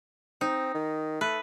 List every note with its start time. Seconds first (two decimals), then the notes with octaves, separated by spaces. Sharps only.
0.41 C4 D#4
0.74 D#3
1.21 A3 B4